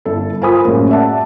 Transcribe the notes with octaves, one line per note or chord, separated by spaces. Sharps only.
G1 E4 A4
F4 A#4 C5 G#5 B5 D#6
F#2 A2 G#3 A#3
D5 E5 F#5 A5